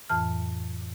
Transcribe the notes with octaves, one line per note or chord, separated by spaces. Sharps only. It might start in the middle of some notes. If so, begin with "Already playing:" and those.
F2 A2 E3 A5 F6